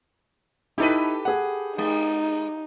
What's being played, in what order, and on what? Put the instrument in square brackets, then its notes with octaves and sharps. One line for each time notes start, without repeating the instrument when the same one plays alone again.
[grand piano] D#4 E4 [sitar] G4 A4 B4
[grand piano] G#4 F#5
[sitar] G#3 [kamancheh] D#4